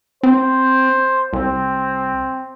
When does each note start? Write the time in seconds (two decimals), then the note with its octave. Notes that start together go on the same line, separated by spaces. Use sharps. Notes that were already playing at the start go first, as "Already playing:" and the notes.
0.23 C4 C5
1.33 C2 C4